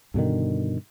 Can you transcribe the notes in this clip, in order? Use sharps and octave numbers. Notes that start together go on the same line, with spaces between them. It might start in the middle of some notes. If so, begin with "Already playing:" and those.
G2 B2 D3 D#3